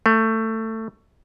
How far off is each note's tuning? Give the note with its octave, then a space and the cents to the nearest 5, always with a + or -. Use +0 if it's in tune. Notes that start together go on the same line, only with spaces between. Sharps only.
A3 +20